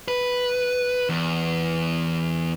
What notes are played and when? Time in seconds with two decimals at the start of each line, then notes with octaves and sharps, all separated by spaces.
0.08 B4
1.09 E2